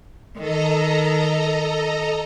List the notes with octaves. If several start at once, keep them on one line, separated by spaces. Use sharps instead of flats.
D#3 A4 D#5 A#5